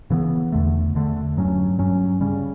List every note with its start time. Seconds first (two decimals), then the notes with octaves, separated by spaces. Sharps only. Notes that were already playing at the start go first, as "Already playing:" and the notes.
0.10 C#3 E3 B3
0.52 E2 D3 A3
0.95 E2 D3 A3
1.37 G2 F#3 C#4
1.79 G2 F#3 C#4
2.21 C#3 G3 C#4